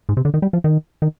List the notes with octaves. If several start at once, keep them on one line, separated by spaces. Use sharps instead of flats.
G#2
C3
D3
D#3
G3
F3
D#3
D#3